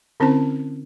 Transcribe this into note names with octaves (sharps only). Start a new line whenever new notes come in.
D3 C4 C#4 E4 C5 A5